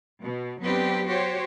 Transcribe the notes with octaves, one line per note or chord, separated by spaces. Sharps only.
B2
F#3 B3 C4 D4 G4 B4
F#4 G4 C5 C#5